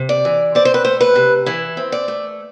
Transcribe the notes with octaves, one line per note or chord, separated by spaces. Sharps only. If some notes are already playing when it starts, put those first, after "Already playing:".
Already playing: C3
D5
E3
C4 D5
C5
B4
A3 C5
B4
C3
E3 E4
C4
D5
A3